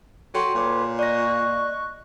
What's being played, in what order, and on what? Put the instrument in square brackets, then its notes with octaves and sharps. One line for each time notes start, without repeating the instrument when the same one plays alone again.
[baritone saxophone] F#3 [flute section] F#4 [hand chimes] A4 G5 C6
[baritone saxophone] A#2 [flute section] B4 C#5 D6
[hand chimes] D5 A#6 [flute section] D#5 C#6 F#6